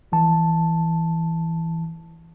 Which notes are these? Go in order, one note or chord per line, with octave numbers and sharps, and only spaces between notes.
A#1 E3 A5